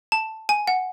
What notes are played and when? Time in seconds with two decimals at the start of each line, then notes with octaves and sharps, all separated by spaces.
0.12 A5
0.49 G#5
0.67 F#5